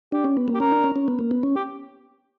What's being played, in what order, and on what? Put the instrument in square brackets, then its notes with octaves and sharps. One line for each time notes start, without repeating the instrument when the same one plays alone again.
[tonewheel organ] D4 [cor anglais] G4
[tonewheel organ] C#4
B3
A#3
[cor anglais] G4
[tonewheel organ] C#4 [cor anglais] A#4
[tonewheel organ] D4
C#4
C#4
B3
A#3
B3
C#4
[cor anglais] G4